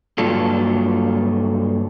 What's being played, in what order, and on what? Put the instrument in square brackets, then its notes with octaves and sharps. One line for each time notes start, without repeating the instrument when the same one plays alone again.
[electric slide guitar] G2 F#3 A#3 F4 A4